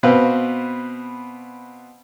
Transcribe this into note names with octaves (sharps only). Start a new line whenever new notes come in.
B2 C4 B4 C5 F5